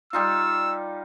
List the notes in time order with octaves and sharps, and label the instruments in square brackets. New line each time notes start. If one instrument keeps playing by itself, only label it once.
[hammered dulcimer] G3 D#4 F4 [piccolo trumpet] E6